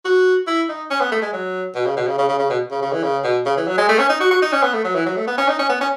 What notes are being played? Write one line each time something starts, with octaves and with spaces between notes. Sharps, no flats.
F#4
E4
D#4
C#4
B3
A3
G#3
F#3
B2
C#3
B2
C#3
C#3
C#3
C#3
B2
C#3
C#3
E3
C#3
B2
C#3
E3
F#3
G#3
A3
C#4
D#4
F#4
F#4
D#4
C#4
B3
A3
F#3
E3
F#3
A3
B3
C#4
D#4
C#4
B3
C#4